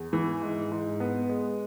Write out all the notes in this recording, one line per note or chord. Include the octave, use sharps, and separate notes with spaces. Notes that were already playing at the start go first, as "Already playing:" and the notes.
Already playing: E2
E3
G#2
G#2
B3
G#3